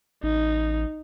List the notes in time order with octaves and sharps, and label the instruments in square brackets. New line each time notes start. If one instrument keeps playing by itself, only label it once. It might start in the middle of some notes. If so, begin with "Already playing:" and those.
[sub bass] A1 [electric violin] D#4